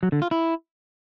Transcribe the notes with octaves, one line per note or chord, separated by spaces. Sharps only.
F#3
D3
F4
E4